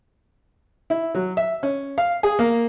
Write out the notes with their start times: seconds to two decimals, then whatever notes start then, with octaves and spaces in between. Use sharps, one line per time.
0.90 E4
1.15 F#3
1.37 E5
1.63 C#4
1.98 F5
2.23 G#4
2.39 A#3